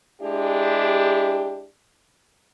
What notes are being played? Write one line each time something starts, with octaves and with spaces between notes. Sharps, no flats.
G#3 D4 E4 G4